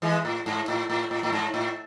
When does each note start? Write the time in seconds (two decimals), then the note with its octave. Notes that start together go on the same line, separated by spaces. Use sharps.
0.02 E3 G#3
0.25 A2
0.46 G#2
0.68 A2
0.90 A2
1.11 A2
1.23 A2
1.32 G#2
1.54 A2